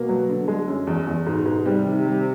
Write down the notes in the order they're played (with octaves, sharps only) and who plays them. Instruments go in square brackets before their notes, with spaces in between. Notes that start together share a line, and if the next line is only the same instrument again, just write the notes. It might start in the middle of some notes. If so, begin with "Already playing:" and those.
Already playing: [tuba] B2 [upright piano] A#3
[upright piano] F#3
D3
G#3
F#2
E2
E2
[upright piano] G#2 [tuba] B2
[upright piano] G#2
[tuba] C3 [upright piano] G3
[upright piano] D#3
G3